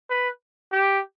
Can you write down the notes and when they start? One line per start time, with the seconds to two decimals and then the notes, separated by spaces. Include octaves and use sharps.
0.10 B4
0.72 G4